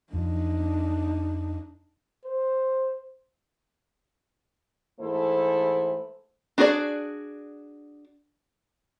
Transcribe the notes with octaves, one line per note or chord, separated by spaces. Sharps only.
F2 F3 D4 D#4
C5
G#2 E3 A3 E4 A4 C5
D4 F#4 G#4 C5 D5